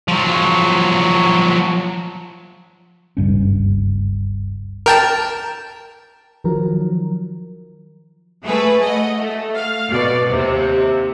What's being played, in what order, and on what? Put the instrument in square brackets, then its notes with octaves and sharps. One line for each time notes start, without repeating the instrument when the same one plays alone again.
[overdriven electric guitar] F3 F#3
[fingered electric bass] F#1 C#2 G2 C#4
[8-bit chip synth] A#4 G5 A5
[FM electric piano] D#3 F3 F#3 A#4
[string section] A3 G#4 B4
D#5 F#5
A3
F5
B2 D5
D#2 C3